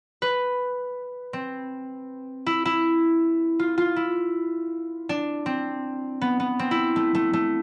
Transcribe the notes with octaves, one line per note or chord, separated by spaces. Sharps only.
B4
C4
E4
E4
F4
F4
E4
D4
C4
B3
B3
C4
E4
A3
A3
A3